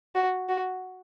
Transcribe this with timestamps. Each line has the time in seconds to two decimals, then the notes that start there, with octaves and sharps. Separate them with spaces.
0.15 F#4
0.49 F#4